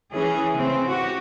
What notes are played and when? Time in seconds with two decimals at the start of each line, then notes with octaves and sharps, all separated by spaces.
0.12 E3 C#4 G#4
0.52 C#3 E3 C4
0.88 F#4 G4